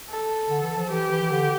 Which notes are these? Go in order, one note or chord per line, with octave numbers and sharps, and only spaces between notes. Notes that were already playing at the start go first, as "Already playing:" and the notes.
A4
D3
E3
F3
E3 G4
E3
E3
D3